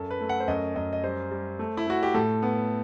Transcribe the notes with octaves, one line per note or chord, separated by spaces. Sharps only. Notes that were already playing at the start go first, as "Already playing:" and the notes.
Already playing: F#2 A4
B4
A3
F#5
C5
F#2 D#5
F#2 D#5
D#5
G3 C5
G3
A3
E4
A3 F#4
G4
A2 A4
B3